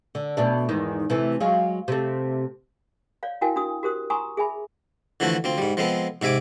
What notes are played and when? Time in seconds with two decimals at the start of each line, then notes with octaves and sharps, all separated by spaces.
0.15 D3
0.37 B2 A3 D4
0.69 E2 G#2 D#3
1.10 C3 E3 A3
1.40 F#3 G#3 F4
1.88 C3 A3
3.23 C#5 D5 F5
3.41 E4 F#4 A#4 F5 G5 G#5
3.56 D4 F#4 D#6
3.83 F#4 G4 A#4 C5 D#6
4.10 G#5 A#5 C6 C#6 D#6
4.37 G#4 E5 G#5 B5
5.20 D3 E3 F3 A3 F#4 A4
5.44 D2 C4 F4
5.58 G#2 G3
5.77 F3 G#3 B3 C4 A4
6.22 G#2 C3 E5 G#5 D6